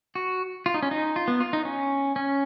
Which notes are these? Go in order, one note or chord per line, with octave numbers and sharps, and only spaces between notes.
F#4
F4
D#4
C#4
D#4
F4
B3
F4
D#4
C#4
C#4